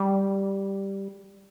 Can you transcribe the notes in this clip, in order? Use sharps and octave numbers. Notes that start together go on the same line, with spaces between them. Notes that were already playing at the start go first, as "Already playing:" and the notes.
Already playing: G3